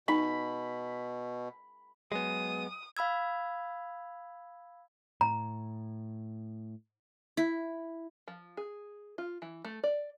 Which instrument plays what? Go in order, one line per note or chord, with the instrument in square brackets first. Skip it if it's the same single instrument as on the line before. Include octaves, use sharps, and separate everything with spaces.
[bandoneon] B2 [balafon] D#4 [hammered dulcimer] B5
[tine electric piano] F#3 G#5 [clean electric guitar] G#3 B3 [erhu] D#6
[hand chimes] F5 B5 E6 G#6
[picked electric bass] A2 [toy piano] A#5
[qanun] E4
[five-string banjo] F3
G#4
F4
E3
A3
D5